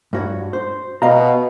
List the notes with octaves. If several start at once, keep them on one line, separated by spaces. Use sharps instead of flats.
G2 F#4 C#5
C5
B2 D#5 F5 A#5